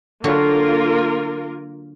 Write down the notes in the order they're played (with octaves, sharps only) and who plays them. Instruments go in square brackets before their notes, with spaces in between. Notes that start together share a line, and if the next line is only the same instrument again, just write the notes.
[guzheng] D3 F#3 F#4 [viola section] A#3 F4 A#4